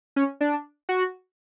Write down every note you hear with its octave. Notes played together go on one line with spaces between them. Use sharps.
C#4
D4
F#4